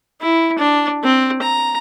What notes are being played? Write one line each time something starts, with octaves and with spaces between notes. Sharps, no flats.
E4
D4
C4
A#5